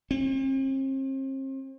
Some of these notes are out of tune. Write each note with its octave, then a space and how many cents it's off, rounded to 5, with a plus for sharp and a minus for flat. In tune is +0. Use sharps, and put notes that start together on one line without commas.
C4 +40